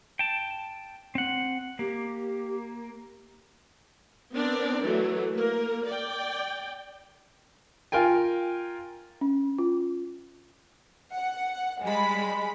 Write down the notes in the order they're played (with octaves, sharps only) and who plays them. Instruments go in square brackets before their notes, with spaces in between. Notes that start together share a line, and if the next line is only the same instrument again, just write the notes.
[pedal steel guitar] G5 A5
C4 F#5
[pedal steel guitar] A#3 [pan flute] G4
[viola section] B3 C4 D4 A#4 D5
E3 F#3 A3
A#3 A#4
D5 G5
[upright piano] F4 A#4 G5 G#5
[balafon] C#4
F4
[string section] F#5
G3 G#3 B5